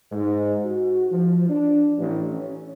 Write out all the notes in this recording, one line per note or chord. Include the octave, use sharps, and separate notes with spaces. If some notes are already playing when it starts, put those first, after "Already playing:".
G#2
F#4
F3
D4
A1
C#4